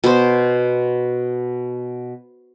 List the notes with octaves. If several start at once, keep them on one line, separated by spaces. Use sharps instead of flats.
B2 C5